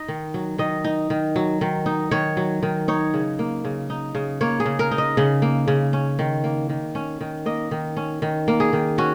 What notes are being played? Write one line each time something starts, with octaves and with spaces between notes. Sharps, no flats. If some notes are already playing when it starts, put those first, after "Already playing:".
Already playing: D#4 D#5
D#3
F#3
D#3 D#5
D#4
D#3
F#3
D#3
D#4
D#3 C#5
F#3
D#3
D#4 C#5
C#3
A#3
C#3
D#4
C#3
A#3 C#5
G#4
C#3
A#4
D#4
D#5
C#3
A#3
C#3
C#4
D#3
A#3
D#3
C#4
D#3
A#3 D#5
D#3
C#4
D#3
A#3
G#4
D#3
C#4 F#4